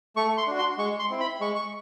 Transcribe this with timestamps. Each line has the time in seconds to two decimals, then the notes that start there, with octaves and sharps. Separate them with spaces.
0.16 A3 C#6
0.38 C6
0.47 D4 F#4
0.58 C6
0.78 G#3 C#6
0.99 C6
1.10 C4 E4
1.20 B5
1.40 G#3 C#6
1.55 C#6